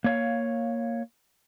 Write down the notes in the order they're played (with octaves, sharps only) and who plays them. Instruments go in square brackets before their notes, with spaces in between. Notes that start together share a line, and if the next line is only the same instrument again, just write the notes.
[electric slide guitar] A#3 C#5 F5